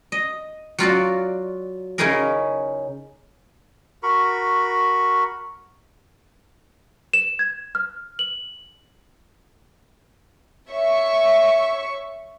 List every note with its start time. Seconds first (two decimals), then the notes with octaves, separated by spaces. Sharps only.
0.12 D#5
0.78 F#3 F4 F#4 D5
1.98 C#3 C#4 D#4 E4 G#4 A#4
4.03 F#4 A#4 B5 C#6
7.14 E7
7.39 G#6
7.75 F6
8.19 F#7
10.70 C#5 E5 C#6